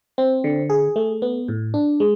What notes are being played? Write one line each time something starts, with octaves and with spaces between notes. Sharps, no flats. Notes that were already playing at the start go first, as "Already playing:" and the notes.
C4
D3
G#4
A3
B3
A2
D4
G#3